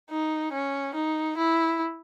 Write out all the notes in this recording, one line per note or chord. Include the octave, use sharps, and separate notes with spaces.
D#4
C#4
D#4
E4